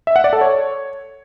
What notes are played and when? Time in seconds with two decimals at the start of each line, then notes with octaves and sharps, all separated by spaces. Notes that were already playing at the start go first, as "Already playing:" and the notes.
0.07 E5
0.16 F#5
0.24 D5
0.33 A4
0.41 C#5